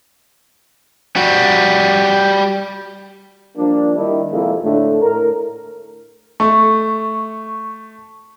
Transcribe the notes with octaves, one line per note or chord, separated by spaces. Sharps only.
G3 F#4
F3 G3 A#3 D4
D#3 G3 E4
F2 G#2 C3 G#3 A#3 E4
A2 D3 A3
A2 A#4
A3 C#6